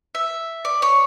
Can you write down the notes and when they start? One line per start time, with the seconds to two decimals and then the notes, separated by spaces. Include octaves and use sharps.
0.15 E5
0.65 D5
0.82 C#5